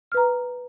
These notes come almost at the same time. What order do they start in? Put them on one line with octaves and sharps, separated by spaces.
F6 B4 A#5